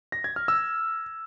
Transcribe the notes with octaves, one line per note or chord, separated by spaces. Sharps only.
A#6
G#6
F6
E6